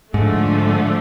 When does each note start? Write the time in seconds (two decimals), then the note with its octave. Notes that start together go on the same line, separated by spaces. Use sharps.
0.13 G#2 D3 F3 A3